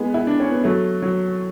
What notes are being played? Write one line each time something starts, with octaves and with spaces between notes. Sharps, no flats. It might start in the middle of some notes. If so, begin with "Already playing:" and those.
Already playing: G#3 B3
E4
D4
C#4
B3
F#3 A3
F#3